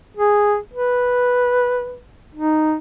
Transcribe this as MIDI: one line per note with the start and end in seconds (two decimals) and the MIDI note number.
0.17 0.57 68
0.73 1.98 71
2.35 2.76 63